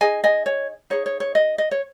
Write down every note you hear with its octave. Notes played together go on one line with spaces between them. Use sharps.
D#4 G#4 D#5 G#5
D#5 G#5
C#5
D#4 G#4 C#5
C#5
C#5
D#5
D#5
C#5